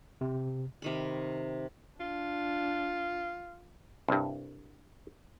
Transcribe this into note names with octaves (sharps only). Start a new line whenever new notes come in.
C3
C3 D#3 B5
D4 F4
C2 G2